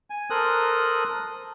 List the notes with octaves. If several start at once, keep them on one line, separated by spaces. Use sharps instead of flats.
G#5
A4 A#4 C5 D#6 F#6